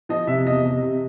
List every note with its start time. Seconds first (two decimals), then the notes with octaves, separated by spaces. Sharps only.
0.09 F3 D#5
0.27 C3 E5
0.46 E2 D#5
0.64 C3
0.83 C3